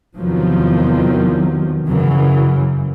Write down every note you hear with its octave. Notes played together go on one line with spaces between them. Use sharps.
E2 C3 D#3 F3 F#3
F#2 C#3 E3 F#3